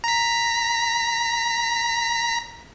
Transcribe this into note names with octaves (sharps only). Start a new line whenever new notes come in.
A#5 B6